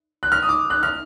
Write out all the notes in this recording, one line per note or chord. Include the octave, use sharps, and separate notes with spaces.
F#6
F6
D#6
D6
F#6
F6